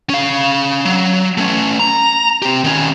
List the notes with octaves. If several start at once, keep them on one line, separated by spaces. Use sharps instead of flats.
C#4 F5
F#3
A3 C#4
A#5
C4 G4
D#3 C#4